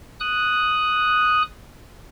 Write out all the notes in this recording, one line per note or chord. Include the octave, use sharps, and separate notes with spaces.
D#6 F#6